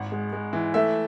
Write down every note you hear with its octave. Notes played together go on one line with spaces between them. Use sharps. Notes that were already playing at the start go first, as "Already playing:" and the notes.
Already playing: G#1 F#5
G#3
G#3
E3
A3 E5